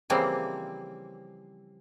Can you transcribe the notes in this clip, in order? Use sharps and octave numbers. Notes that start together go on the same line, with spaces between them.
C#3 E3 F3 G3 A#3 C4